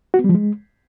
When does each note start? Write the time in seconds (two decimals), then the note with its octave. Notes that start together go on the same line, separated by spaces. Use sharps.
0.14 F#4
0.19 B3
0.24 G3
0.29 F3
0.34 G#3